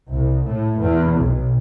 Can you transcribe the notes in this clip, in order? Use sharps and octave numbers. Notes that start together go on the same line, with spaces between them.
C2
A2
E2
B1